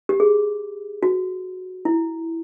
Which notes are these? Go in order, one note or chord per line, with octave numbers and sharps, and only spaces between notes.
G4
G#4
F#4
E4